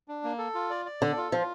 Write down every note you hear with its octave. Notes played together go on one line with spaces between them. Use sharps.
D4
A#3
A4
F4
D5
D5
D3 A4
F4
F3 F4